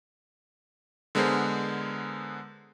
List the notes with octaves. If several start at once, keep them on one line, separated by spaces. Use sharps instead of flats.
D3 G#3 B3 G#4 A#4 C5